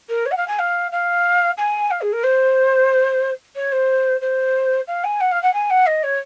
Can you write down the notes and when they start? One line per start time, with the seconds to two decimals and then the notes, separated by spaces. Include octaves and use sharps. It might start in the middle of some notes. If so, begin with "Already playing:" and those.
0.09 A#4
0.26 C#5
0.31 F#5
0.37 F5
0.48 G#5
0.59 F5
0.92 F5
1.58 G#5
1.91 F5
2.01 G#4
2.13 A#4
2.23 C5
3.56 C#5
3.72 C5
4.21 C5
4.87 F5
5.04 G#5
5.20 F#5
5.31 F5
5.43 F#5
5.53 G#5
5.70 F#5
5.86 D#5
6.03 C#5